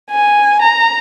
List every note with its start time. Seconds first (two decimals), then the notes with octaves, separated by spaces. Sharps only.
0.11 G#5
0.62 A#5